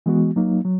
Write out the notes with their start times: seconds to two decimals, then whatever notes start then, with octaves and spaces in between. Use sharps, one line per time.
0.06 E3 G#3 B3 F#4
0.36 F#3 A#3 D#4
0.65 F#3